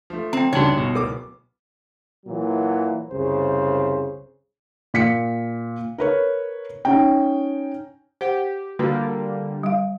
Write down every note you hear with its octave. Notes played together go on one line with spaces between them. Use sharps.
F3 A3
C4 G5 A#5
D2 G2 C#3 D4 D#4 F#4 C#5
G1 B2
D1 B3 A#4 D6
A#2 E3 F#3
C2 F#2 C#3 C5
A#2 B6 C#7
A#4 B4 C#5
C#4 D#4 G5
G4 C5 F#5
D3 G3 A#3 F4 F#4 B4
G3 F5